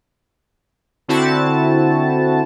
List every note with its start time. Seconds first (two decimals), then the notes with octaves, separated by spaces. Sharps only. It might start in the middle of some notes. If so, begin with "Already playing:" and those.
1.08 D3 C4 E4 F#4 A5